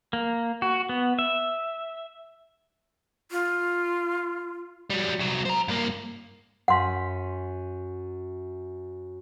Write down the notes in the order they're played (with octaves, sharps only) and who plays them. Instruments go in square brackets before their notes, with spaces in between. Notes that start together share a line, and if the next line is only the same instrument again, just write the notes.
[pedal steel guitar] A#3
F#4
B3
E5
[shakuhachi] F4
[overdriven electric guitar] F#3 G3
C2 F#3
C5 A#5
G2 A#3
[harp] F#2 B6 [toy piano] F#5 C6